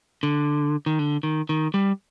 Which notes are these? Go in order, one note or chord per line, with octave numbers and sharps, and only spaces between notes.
D3
D#3
D3
D#3
D#3
G3